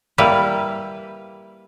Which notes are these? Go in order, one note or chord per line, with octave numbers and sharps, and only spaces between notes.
G3 A#3 E4 B4